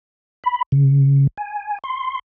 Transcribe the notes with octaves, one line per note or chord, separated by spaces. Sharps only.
B5
C#3
G#5
C6